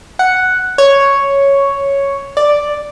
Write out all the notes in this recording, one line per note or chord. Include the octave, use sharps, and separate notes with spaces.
F#5
C#5
D5